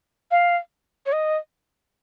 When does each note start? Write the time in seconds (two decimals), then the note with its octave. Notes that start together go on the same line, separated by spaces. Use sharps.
0.31 F5
1.06 C#5
1.12 D#5